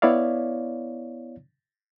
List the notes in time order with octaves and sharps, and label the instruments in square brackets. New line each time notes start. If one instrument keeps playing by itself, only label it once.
[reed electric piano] B3 E4 C#5 D5 F5